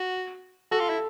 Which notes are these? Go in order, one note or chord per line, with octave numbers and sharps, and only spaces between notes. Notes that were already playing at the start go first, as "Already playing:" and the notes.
Already playing: F#4
F#4 A4
F4
E4